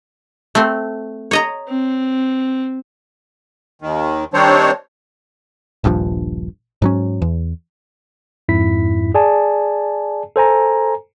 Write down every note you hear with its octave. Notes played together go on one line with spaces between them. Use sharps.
A3 C4
C#5 D#5 A#5
C4
D#2 D#3
D#3 G3 C4 D4 C5 C#5
D#1 A#1 G2 F3
G#2 F#3 C#4
E2
F2 G#2 E4 B6
G#4 D5 G#5 A5
A4 C5 G#5 A#5